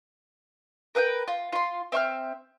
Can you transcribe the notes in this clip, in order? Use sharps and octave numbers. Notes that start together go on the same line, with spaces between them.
A#4 B4 E5 G5
F4
F4 C6
C4 E5 C#6 F6